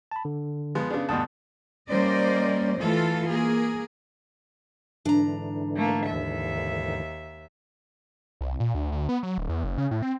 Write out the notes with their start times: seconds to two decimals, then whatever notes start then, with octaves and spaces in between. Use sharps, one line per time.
0.11 A5 B5
0.25 D3
0.75 F3 G#3 B3
0.91 C#3 B3 D4 G#4
1.09 D2 G2 B2 A5 D#6
1.89 G3 A#3 C#4 C5 D5 D#5
2.78 E3 A3 F4 A4
3.28 A#3 G#4
5.05 G#2 D3 E3 D4 A#5
5.76 A3 A#3
6.06 D#2 E5
8.41 C2
8.60 A#2
8.75 D2
8.92 D2
9.09 B3
9.23 F#3
9.38 D1
9.49 E2
9.64 F#1
9.78 C#3
9.91 A2
10.02 C4